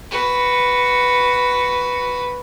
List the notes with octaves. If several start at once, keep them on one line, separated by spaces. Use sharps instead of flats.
F#4 B4